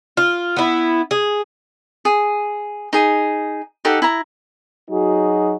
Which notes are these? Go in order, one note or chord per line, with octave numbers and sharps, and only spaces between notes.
F4
B3 E4
G#4
G#4
D#4 G#4
D#4 G4 A4 F#5
E4 A#5
F#3 D#4 F#4 G#4